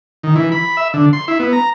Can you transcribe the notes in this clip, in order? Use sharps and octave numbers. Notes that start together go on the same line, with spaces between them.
D#3
E3
B5
E5
D3
C6
E4
B3
A#5